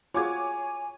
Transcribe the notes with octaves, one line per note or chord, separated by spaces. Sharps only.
F4 F#4 G#4 C#5 G#5 D6 G#6